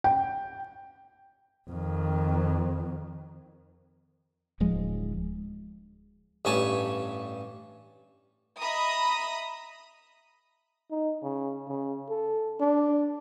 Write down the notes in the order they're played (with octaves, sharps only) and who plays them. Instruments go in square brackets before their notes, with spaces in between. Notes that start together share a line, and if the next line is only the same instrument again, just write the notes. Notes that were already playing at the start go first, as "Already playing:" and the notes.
[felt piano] G5
[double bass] F2 D#3
[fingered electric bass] D1 F3 G#3
[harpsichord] A1 G2 C#5 G#5 A5 B5
[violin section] D#5 E5 A#5 B5 D#6
[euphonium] D#4
C#3
C#3
A4
D4